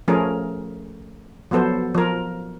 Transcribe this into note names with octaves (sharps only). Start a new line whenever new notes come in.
F3 A3 C#4 G#4 A#4
F3 F#3 B3 A4 C5
F3 A#4